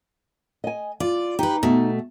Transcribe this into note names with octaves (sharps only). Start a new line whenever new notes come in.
D#5 G#5
F4 D5
D#4 G4 B4
B2 A3